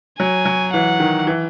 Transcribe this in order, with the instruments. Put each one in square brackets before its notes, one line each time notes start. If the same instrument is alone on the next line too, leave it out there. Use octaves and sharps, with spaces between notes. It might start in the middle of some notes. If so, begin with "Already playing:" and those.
[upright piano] F#3 [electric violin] G#5
[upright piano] F#3
[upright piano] E3 [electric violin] F#5
[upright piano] D#3
E3